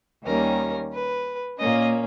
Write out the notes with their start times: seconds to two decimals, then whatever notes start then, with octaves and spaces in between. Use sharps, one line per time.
0.25 D#2 D#3 G3 A#3 C#4 A#4
0.92 B4
1.59 A#2 A#3 C#4 D#5